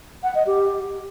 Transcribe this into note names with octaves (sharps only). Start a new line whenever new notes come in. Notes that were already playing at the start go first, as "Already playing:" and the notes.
F#5
D#5
G4